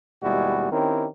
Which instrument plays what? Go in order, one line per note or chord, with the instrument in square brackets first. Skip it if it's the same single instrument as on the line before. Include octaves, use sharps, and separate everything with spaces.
[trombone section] D#2 B2 G3 G#3 E4 F#4
D#3 C4 C#4 E4 G4 A#4